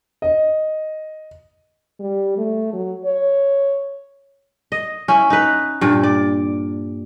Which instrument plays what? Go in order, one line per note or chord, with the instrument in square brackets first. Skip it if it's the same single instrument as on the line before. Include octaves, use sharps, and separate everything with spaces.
[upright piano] D#5
[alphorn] G3
A3
F#3
C#5
[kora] D#5
C#4 E4
D#4 B4
G2 A#2
D5